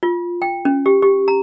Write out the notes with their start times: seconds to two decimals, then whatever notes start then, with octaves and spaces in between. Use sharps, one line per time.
0.03 F4
0.42 G5
0.65 C#4
0.86 G4
1.02 G4
1.28 A#5